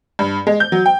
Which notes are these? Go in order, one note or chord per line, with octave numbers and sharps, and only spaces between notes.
G2
G#3
G6
F#3
G5